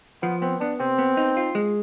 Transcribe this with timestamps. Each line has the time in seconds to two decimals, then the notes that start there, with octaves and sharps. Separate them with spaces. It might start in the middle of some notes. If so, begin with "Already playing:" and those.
0.22 F3 B3
0.42 B3 C4
0.60 B3 D4
0.80 C3 C4
0.99 B3
1.17 D#4
1.37 F4
1.55 G#3